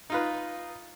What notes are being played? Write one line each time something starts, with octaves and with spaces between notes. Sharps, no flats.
D#4 F4 B4